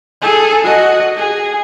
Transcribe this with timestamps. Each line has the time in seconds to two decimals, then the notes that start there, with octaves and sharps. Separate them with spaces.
0.21 G#4 A4
0.64 F#4 D#5
1.17 G#4